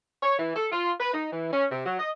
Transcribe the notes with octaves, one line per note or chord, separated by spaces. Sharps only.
C#5
E3
A4
F4
B4
D#4
E3
C#4
C3
F#3
D#5